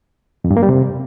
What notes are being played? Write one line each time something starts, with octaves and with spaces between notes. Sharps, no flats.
F2
G2
A#3
G3
C3